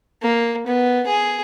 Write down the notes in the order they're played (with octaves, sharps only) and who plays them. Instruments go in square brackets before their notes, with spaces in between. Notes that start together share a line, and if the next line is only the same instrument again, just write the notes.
[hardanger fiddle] A#3
B3
G#4